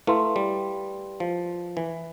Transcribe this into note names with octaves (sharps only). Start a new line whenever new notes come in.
A3 E4 B4 F5 C6
G3
F3
E3